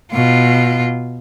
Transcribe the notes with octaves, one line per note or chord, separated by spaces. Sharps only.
B2 F4